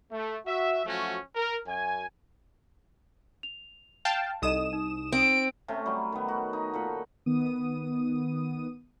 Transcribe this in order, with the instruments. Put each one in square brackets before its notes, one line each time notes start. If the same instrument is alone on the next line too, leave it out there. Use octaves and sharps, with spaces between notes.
[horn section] A3
F#4 E5
F3 F#3 A3 C#4 F#4
A#4
F#2 G#5
[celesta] F7
[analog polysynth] F5 G5 A5
[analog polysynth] C2 D#6 E7 [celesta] D#4 A4 D#5
[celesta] D#4
[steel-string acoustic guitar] C4 [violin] D7
[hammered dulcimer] C3 A3 C#4
F#3 G3
D#3 B3
F#4
D#4
A#2 A4 B5
[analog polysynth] D#3 B3 D#6 D#7